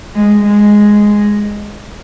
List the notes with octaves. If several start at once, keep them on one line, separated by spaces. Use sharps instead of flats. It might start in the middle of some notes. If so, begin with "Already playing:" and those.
G#3
G#3